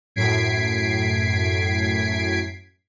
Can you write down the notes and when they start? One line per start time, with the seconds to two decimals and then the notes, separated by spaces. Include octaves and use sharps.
0.16 F#2 A2 G#6 B6 C7 D7